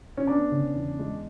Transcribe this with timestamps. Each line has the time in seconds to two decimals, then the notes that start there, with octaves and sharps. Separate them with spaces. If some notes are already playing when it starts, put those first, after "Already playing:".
0.17 C#4
0.27 B3 D4
0.51 C#3
0.75 E2
0.99 G#3